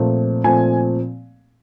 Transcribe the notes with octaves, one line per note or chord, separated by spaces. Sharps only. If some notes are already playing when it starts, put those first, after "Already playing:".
Already playing: A#2 F3 A3 C4
A#2 F3 A3 C4 G#5